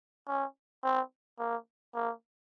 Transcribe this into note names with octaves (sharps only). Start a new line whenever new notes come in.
C#4
C4
A#3
A#3